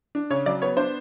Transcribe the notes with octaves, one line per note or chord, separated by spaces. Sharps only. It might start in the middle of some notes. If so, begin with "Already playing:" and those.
D4
C#3 C#5
F#3 D5
B3 C#5
D4 C5